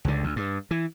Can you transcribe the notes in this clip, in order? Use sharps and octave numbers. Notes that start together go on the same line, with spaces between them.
C#2 D3
D2
G2
E3